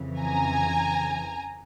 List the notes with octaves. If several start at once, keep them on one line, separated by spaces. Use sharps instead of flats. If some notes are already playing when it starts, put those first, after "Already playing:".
Already playing: F2 C#3 E3
G#5 A#5